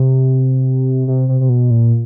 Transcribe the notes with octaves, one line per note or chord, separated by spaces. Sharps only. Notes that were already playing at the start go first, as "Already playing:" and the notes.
Already playing: C3
C3
C3
C3
B2
A#2